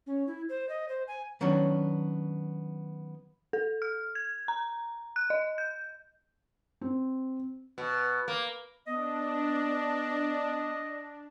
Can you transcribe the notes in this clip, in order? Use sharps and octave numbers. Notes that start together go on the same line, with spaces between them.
C#4
E4
C5
D#5
C5
G#5
D#3 F#3 B3 C#4 D4
A4
F6
G#6
A#5
F#6
D#5
G6
C4
B2
A#3
B3 D4 D#5